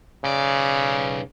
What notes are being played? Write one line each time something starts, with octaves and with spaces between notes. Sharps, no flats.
B1 C#3 D5